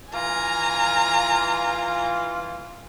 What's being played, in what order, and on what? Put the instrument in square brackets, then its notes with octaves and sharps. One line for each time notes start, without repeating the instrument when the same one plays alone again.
[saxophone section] E3 F4 [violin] G#5 A#5